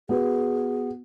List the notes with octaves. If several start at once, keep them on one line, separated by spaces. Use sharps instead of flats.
B3 F#4 G#4